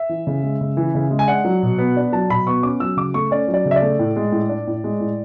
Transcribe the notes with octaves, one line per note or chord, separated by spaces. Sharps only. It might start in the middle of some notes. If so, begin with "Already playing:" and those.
Already playing: E5
E3
C#3
G#3
C#3
E3
C#3
G#3
G#5
D4 F#5
F#3
B2
B3
D4
F#3 A5
B2 B5
B3 C#6
C#4 D6
F#3 E6
C#3 D6
A3 C#6
C#4 D5
F#3
D5
C#3
E5
D5
A3
A2
G#3
A2
D4
A2
G#3
A2